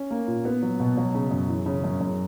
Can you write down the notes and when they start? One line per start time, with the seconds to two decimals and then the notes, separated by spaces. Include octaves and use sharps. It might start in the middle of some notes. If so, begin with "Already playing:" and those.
Already playing: C#4
0.11 A#3
0.28 A#2
0.45 B3
0.63 F#3
0.80 B2
0.97 F#3
1.15 C#3
1.31 F#2
1.49 E3
1.66 C#3
1.84 F#2
2.01 F#2